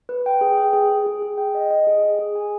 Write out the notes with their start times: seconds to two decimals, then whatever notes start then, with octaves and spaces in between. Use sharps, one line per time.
0.09 B4
0.26 G5
0.41 G#4
0.57 G5
0.73 G#4
0.89 G#4
1.06 G#4
1.22 G#4
1.38 G5
1.55 D#5
1.71 D#5
1.87 G#4
2.03 G#4
2.19 G#4
2.35 G#5